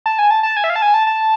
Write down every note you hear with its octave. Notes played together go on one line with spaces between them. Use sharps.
A5
G#5
A5
A5
G#5
E5
F5
A5
G#5
A5
A5